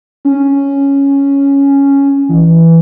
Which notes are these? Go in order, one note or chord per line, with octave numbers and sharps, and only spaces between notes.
C#4
E3